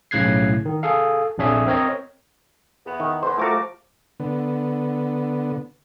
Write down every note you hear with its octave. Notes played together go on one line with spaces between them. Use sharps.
B1 A2 C#3 F#6 G#6 C7
D#3
G#4 A4 F5
A#1 F2 D4 G#4 C#5 E5
C4 A#4 C#5 D#5
E2 E3 B3
D#3
E2 B4 C5
F3 A3 F#4 A#4 D6
D3 B3